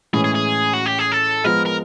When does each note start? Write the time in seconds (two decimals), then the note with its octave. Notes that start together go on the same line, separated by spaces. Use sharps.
0.13 A2 E3 G#3 C#4 G#4
0.24 G#4
0.35 G#4
0.73 F#4
0.86 G4
0.99 G#4
1.12 A4
1.44 F3 G#3 B3 A#4
1.66 A#4